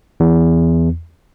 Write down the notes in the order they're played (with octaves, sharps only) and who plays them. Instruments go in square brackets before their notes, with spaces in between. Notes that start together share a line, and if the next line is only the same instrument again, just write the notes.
[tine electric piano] E2